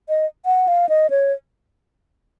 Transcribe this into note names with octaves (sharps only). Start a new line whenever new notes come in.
D#5
F#5
F5
D#5
C#5